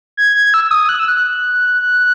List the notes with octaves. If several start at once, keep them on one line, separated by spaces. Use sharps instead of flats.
G#6
G#6
E6
D#6
F#6
E6
F#6